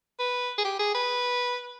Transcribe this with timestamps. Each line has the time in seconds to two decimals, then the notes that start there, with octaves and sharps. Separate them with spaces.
0.19 B4
0.58 G#4
0.64 G4
0.79 G#4
0.95 B4